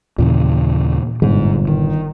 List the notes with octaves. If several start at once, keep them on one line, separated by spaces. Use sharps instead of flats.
D#2 A#2 C#3 E3
G1 G#2
D#3